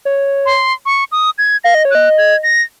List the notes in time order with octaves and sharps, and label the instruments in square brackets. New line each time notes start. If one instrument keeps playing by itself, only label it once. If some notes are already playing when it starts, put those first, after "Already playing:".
[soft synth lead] C#5
[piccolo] C6
C#6
D#6
G#6
[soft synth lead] F5 [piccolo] A#6
[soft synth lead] D#5
C#5
[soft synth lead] D#5 [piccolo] F#6
[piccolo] G#6
A#6